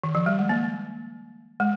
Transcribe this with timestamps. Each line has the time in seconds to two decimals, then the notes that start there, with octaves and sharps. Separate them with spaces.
0.04 D#3
0.15 F3
0.26 G3
0.39 G#3
0.49 A#3
1.60 G#3